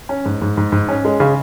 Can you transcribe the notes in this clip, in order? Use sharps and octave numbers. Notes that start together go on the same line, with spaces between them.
C#4
G#2
G#2
G#2
G#2
C#4
G#3
C#3